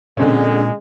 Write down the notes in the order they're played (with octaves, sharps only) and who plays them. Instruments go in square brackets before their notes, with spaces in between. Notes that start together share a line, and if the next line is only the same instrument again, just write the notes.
[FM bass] A#2 [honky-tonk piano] D3 C4 C#4 [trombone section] G#3